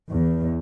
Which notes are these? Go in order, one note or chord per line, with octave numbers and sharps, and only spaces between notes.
E2